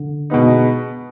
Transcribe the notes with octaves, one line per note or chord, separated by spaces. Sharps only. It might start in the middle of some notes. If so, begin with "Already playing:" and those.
Already playing: D3
B2 G#3 B3 D#4